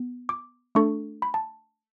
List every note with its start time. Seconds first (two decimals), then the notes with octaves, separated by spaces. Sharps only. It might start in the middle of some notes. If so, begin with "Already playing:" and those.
Already playing: B3
0.29 D6
0.75 A3 D4 A4 C#6
1.22 B5
1.34 A5